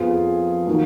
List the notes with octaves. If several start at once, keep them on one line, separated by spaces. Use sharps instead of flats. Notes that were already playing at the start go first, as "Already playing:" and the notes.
Already playing: F2 F3 B3 F4 G#4
D#3 F#3 A#3